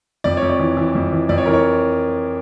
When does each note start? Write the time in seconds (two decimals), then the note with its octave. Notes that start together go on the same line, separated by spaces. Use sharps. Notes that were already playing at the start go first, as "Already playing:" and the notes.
0.24 F2 D5
0.37 C#5
0.42 F2
0.49 D5
0.60 E3
0.77 E3
0.95 F2
1.13 E3
1.29 F2 D5
1.38 C#5
1.46 E3 A#4
1.53 C#5